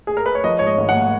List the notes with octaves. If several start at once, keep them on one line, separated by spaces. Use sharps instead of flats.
G#4
A#4
B4
C#5
F3 D#5
G#2 C#5
D#5
G#1
F#5
A#3